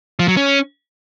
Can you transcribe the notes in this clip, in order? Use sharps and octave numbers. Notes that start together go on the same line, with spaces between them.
F3
F#3
C#4